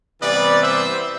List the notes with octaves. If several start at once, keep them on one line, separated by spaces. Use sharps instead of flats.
C3 E3 G3 B3 B4 D5
C5 E5